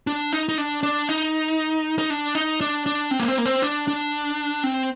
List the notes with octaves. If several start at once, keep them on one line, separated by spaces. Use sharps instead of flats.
D4
D#4
D#4
D4
D4
D#4
D#4
D4
D#4
D4
D4
C4
A#3
C4
A#3
C4
D4
D4
C4